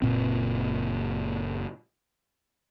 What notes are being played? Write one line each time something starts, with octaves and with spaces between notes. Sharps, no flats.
F#1 A#2 C4